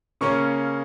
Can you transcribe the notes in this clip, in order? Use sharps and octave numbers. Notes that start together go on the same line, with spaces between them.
C#3 A#3 C#4 C#6